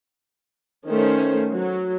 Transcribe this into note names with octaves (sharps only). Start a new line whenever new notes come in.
D#3 A3 C#4 C5
F#3